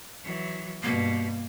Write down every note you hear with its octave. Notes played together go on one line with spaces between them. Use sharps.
E3 F#3
G2 B2 A#3